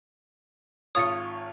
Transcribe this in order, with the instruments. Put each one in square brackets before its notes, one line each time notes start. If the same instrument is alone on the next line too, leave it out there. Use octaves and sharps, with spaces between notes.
[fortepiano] G#1 F4 C#5 [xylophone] D#6 A6 C#7